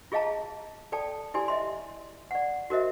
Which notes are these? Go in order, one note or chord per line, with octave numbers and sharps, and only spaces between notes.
F4 G#4 D#5 F5 A5 A#5
A4 D5 G5 A5
E4 G4 D5 G#5 C6
D#5 E5 C6
D5 F#5
F#4 A#4 C5 D#5 E5